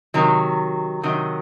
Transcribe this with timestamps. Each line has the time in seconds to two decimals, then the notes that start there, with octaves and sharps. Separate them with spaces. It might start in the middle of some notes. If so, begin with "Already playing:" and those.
0.14 C3 D#3 F#3
1.03 C3 D#3 F#3